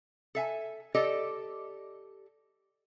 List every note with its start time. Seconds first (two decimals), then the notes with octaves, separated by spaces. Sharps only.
0.35 A4 E5 G#5
0.95 G4 A4 D5 D#5